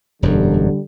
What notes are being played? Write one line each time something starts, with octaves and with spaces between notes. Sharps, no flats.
E1 F#2 D3 G3